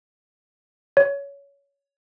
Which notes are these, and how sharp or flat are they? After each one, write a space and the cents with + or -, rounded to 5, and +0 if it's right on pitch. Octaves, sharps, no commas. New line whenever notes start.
C#5 +20